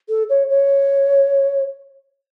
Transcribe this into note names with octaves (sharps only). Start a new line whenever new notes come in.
A4
C#5
C#5